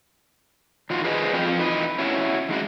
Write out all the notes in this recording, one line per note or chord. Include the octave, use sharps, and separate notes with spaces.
D#3 F4 F#4
G#4 B4 C5 D#5 G#5
F2 F4 G5
E3 D#4 B4
C#4 E4 F#4
D#3 G#3 F#4